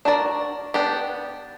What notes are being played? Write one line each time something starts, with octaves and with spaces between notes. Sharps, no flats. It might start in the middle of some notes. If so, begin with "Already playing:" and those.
D4 F#4 A#4 D5
B3 D4 G4